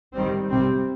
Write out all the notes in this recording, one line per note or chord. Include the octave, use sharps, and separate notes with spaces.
D#3 G3 C4
C3 G3 C4